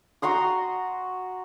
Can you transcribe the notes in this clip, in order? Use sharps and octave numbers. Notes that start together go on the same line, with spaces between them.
F#4 A#5 C6 D#6